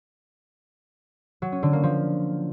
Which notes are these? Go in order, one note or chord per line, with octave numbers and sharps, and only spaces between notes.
F#3
C#4
D3
A#3
F3